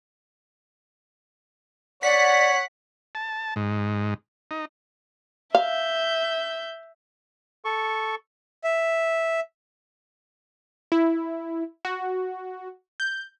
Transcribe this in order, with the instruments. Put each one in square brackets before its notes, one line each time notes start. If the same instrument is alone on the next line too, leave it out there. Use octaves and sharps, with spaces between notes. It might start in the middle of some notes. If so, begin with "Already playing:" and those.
[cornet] C#5 [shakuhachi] D5 [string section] F#5 [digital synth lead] B6
[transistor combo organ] A5
G#2
D#4
[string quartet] E5 G6 [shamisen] F5
[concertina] A4 C#6
[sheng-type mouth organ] E5
[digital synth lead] E4
F#4
G6